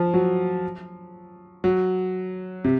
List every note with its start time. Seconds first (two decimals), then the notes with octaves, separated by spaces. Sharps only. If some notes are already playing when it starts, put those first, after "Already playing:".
Already playing: F3
0.14 F#3
1.64 F#3
2.64 C3